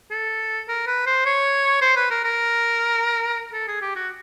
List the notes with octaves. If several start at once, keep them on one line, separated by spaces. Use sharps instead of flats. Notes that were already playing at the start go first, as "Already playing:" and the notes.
A4
A#4
B4
C5
C#5
C5
B4
A#4
A#4
A4
G#4
G4
F#4